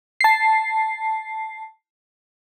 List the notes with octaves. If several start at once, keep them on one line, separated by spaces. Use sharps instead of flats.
A5 C7